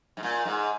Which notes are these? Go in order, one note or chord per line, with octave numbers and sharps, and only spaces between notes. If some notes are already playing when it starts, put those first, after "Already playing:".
G#2
A#2
G#2